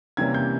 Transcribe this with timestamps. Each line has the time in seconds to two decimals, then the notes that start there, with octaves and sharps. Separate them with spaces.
0.17 C3 E3 G3 A#3 C#4 G#6
0.34 G6